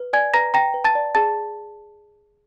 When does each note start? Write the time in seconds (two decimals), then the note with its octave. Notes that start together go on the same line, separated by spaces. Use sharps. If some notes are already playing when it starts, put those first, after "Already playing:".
Already playing: B4
0.13 D5 G#5 G#6
0.34 B4 A#5 A#6
0.54 G5 A#5 A#6
0.74 B4
0.84 A5 A6
0.95 D5
1.15 G#4 A5 A6